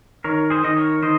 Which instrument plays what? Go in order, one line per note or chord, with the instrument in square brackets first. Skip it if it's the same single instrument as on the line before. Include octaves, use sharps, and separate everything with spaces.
[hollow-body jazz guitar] D#3 [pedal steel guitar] A#4 C#5
[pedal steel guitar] G#4 C5
[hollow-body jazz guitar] D#3 [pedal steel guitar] D#5
[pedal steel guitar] A#4 C#5
[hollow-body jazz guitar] D#3 [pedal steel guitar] C5 D#5